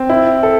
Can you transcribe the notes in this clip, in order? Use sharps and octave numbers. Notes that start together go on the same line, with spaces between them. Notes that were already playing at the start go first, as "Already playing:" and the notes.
Already playing: C4
E4
A4